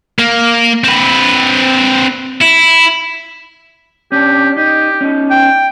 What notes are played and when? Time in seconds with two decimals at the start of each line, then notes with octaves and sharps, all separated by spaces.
0.19 A#3
0.84 C4 B4
2.41 E4
4.12 C#4 D4 G4
4.57 D#4 G4
5.01 C#4 D#4
5.31 G5